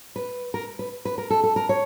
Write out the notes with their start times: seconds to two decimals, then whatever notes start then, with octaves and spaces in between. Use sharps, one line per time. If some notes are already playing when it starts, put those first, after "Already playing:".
0.16 B4
0.54 A#4
0.79 B4
1.05 B4
1.18 A#4
1.30 A4
1.43 A4
1.56 A#4
1.69 C#5